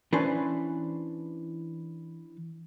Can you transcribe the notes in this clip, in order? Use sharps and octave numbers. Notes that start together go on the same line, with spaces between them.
E3 C#4 D4 B4 C5